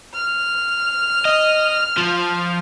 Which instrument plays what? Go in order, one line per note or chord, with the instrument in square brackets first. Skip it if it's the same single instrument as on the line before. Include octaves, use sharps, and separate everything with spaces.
[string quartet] F6
[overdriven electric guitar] D#5
F3